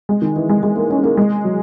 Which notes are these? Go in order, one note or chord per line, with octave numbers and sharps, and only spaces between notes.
G#3
D#3
E3
G#3
G#3
A#3
C#4
A#3
G#3
F#3